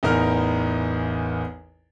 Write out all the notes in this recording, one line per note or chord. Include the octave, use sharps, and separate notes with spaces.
A1 E2 D#4 A#4 F6